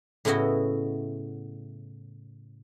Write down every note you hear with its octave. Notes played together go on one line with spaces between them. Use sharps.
A2 C#3 B3 E4 F#4 D#5